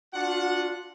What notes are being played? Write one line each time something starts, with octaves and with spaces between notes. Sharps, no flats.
D4 F4 F#4 F#5